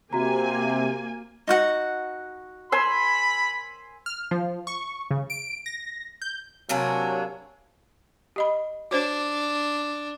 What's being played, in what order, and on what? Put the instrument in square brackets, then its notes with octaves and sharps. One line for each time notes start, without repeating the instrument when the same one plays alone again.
[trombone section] C3 [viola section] A#3 G#5 [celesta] F#4 A#5
[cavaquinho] D#4 F#4 F#5
[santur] G#5 C6 E6 [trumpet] B5
[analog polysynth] F6
F3
C#6
C#3
D7
A#6
G6
[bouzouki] C3 A#3 D4 [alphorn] F#3 [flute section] C#5 G#5 E6
[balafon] G4 D#5 B5
[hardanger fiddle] D4 [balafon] F#4 C5 C#5